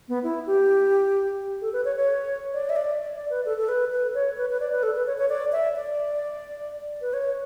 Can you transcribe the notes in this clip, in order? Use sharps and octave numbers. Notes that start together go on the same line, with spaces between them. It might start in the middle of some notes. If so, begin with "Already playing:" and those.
B3
E4
G4
A4
B4
C#5
C#5
D5
E5
D5
D5
B4
A4
A4
B4
B4
C#5
B4
B4
D5
B4
A4
B4
C#5
C#5
D5
E5
D5
B4
C#5